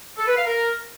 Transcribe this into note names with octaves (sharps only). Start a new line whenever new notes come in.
A4
B4
F5
A#4